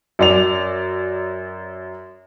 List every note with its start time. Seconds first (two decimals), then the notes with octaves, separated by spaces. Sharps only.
0.19 F#2 D5 F7